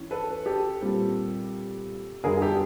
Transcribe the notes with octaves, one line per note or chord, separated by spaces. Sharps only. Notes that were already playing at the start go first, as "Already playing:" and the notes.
Already playing: E3 C#4
A4 B4
G4 A4
A#2 G3 C4
F#2 D3 G3 B3 G#4 A#4
G4 A4